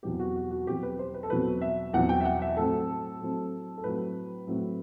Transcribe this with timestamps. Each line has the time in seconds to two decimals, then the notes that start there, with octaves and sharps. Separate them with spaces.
0.03 E2 B2 F#3 C4 G4
0.20 F#4
0.36 F#4
0.51 F#4
0.67 E2 B2 F#3 C4 G4
0.83 B4
0.99 C5
1.14 B4
1.23 A4
1.30 E2 B2 F#3 C4 B4
1.61 E5
1.93 E2 B2 F#3 C4 F#5
2.09 G5
2.20 E5
2.25 F#5
2.42 E5
2.57 A2 F#3 C4 A4
3.21 A2 F#3 C4
3.78 A4
3.84 A2 F#3 C4 B4
4.47 A2 F#3 C4